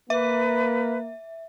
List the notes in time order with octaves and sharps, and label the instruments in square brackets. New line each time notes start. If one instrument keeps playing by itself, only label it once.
[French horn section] A#3 [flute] B4 [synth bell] E5